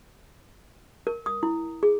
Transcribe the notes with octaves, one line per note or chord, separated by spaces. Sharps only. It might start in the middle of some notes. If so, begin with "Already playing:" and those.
A#4
D#6
E4
G#4